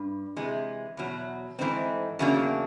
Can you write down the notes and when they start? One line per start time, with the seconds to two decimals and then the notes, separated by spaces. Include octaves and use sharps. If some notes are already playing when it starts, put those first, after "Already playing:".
Already playing: G2
0.37 C3 E3 G#3
0.97 E2 B2 F#3
1.59 G#2 E3 A3 C4 D#4
2.19 E2 C#3 F#3 A#3 D4